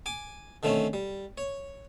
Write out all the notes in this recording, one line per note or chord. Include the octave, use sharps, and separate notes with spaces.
G#5 D6
D3 D#3 A3 C4 C#4
G3
C#5